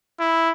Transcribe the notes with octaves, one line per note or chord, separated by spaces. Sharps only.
E4